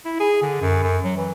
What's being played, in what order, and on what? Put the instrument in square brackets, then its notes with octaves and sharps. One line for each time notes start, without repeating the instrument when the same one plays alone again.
[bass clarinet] E4
G#4
D3
F#2
F#2
F#3
E3